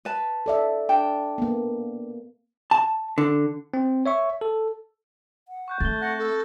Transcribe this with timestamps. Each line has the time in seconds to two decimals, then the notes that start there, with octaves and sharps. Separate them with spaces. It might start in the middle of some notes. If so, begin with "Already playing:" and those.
0.05 B4 A5
0.46 A4 D5 E5
0.89 D4 G5 A5
1.38 A#3 B3
2.71 A5
3.18 D3
3.74 C4
4.06 C#5 E5 C#6
4.41 A4
5.48 F#5
5.68 C#6 F#6 G6
5.80 A3 C4 A6 G7
6.01 F#5 F#6 A#6 F#7
6.19 A4